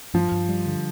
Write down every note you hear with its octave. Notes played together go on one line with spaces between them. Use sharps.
G2 F3
G2
G3
D3